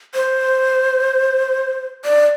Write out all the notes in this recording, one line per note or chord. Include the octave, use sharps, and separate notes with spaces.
C5
D5